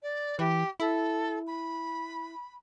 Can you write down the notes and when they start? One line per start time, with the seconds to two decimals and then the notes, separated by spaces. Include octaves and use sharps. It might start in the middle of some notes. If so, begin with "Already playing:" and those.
0.02 D5
0.39 E3 G4
0.80 E4 A4
1.47 B5